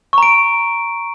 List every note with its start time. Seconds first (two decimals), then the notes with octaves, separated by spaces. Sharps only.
0.13 C#6
0.18 A#5
0.23 D7